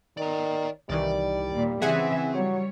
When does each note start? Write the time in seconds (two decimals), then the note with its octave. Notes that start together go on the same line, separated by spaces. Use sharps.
0.17 D#3 D5 A#5
0.90 C2 D#3 E3 G3 D5
1.51 D#2 A#2
1.82 C#3 E3 C4 G#4 E5 F#5 G#5
2.34 F#3 G3 C#5